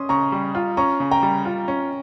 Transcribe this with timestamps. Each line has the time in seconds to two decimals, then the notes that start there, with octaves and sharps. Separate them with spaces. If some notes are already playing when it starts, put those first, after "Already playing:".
Already playing: C#4 C6 D#6
0.09 C#3 A#5 C#6
0.32 G3
0.55 F4
0.77 C#4 A#5 C#6
1.00 C#3
1.11 G5 A#5
1.23 G3
1.45 F4
1.68 C#4